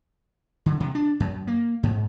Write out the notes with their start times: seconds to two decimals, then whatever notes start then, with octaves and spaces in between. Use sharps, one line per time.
0.66 D3
0.80 C3
0.95 D4
1.20 F#2
1.47 A#3
1.83 G#2